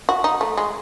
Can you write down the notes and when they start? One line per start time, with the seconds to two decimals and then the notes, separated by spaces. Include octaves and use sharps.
0.09 F#4
0.24 D#4
0.41 A3
0.57 G#3